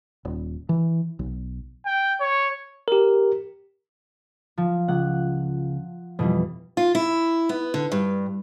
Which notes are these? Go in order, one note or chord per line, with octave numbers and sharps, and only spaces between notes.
D#1
E3
B1
G5
C#5
G4 A#4
F3
C#2 F#5
F2 B2 E3 G3
F4
E4
B3
D3
G2